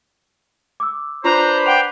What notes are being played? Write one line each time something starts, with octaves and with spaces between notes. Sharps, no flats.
D6 E6
D4 F4 B4 C5 A#5
F#5 G5 D6 F7